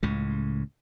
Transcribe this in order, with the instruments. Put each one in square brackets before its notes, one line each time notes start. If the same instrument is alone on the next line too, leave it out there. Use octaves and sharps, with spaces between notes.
[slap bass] C#2 A2 C#3